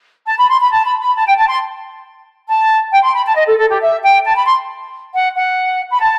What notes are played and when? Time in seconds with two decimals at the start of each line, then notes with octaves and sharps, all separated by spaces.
0.27 A5
0.38 B5
0.50 C6
0.60 B5
0.72 A5
0.86 B5
1.01 B5
1.16 A5
1.26 G5
1.38 A5
1.49 C6
2.48 A5
2.92 G5
3.03 C6
3.14 B5
3.26 A5
3.36 D#5
3.47 A4
3.58 A4
3.70 G4
3.81 E5
4.03 G5
4.25 A5
4.36 B5
4.47 C6
5.14 F#5
5.36 F#5
5.91 B5
6.01 A5